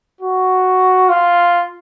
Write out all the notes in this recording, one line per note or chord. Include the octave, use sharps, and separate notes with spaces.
F#4
F4